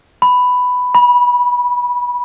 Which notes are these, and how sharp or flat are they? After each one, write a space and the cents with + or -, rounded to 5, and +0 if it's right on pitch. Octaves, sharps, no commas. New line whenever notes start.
B5 +10
B5 -20